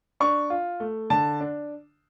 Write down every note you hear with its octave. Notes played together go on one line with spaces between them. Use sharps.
D4 C#6
F4
A3
D3 A5
D4